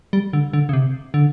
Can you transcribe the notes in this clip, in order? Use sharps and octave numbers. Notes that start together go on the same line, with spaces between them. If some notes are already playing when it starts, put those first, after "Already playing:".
G3
D3
D3
C#3
C3
D3